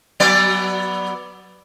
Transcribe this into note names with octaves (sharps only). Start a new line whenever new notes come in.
F#3 B3 D5